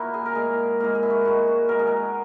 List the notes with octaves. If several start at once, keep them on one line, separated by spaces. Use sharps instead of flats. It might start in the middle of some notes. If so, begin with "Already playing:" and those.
Already playing: A#2 E4 F#4 A#4
G#4
A#4
A#2 G#3 G#4
A#2 G#3 A#4
G#4
E4
F#4
A#2 G#3 F#4
F#4
B2 G#3 A#4
G#4
A#4